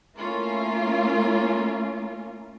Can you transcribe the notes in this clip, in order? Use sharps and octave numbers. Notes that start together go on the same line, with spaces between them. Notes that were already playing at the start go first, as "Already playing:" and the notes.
A3 A#3 C#4 E4 F4 A#4